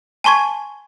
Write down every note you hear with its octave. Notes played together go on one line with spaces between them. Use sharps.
G#5 A5 C6 C#6 G#6